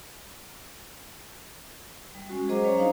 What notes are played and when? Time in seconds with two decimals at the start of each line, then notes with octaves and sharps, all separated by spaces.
2.15 G3
2.29 G#3 C#4 F#4
2.48 F#3 G#4 C5 D#5 A#5 D6
2.64 G3 C#4 C#5 A#5
2.77 D4 D#4 C5 F5 A#5